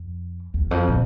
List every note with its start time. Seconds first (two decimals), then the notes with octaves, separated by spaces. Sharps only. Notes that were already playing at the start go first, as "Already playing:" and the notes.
Already playing: F2
0.54 E2
0.71 F2
0.88 A#2